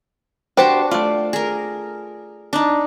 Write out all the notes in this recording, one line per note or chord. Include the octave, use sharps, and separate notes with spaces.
D4 F#4 G4 C5 A5 C#6
A3 F4 D5
G#4 A#4
D4 D#4